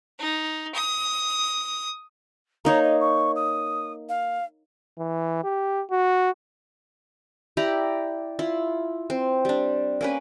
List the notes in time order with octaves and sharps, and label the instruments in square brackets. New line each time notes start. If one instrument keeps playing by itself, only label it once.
[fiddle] D#4
D#6
[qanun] A#3 D#4 C#5 [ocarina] A#5
[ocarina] D#5
C#6
D#6
F5
[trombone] E3
G4
F#4
[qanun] E4 G4 D5 A#5
E4 F4
C4
G3 D4
A#3 C#4 B4